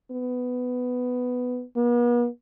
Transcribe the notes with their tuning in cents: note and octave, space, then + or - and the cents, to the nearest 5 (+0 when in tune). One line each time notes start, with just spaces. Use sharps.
B3 +10
B3 -45